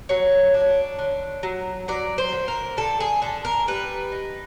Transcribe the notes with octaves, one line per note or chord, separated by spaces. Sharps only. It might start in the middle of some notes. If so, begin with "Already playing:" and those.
F#3 C#5
D4
D3
F#3
F#3 D5
C5
D3
A#4
D3 A4
G#4
D3 A4
A#4
G3 B4
D#4